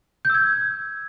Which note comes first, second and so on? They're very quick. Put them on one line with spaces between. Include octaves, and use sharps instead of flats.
G6 E6 G#6